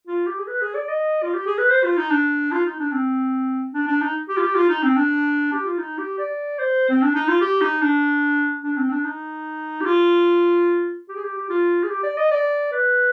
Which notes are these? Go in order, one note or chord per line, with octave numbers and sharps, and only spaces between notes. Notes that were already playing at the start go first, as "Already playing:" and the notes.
F4
G4
G#4
B4
G#4
D5
D#5
F4
G4
G#4
B4
C5
F4
D#4
D4
F4
D#4
D4
C4
D4
D4
D#4
G4
F4
G4
F4
D#4
C4
D4
G4
F4
D#4
G4
D5
C5
C4
D4
D#4
F4
G4
D#4
D4
D4
C4
D4
D#4
G4
F4
G4
G#4
G4
G4
F4
G#4
G4
D5
D#5
D5
B4